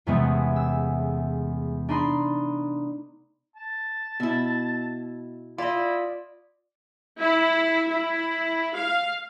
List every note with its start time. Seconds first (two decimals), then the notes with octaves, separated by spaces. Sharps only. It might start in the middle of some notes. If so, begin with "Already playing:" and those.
0.07 E2 C3 G#3 A3 B3 C#4
0.56 E6
1.88 D4 D#4 B5 C6
3.56 A5
4.20 B2 E4 E5
5.58 E4 F4 D5 D#5
7.20 E4
7.89 E4
8.76 F5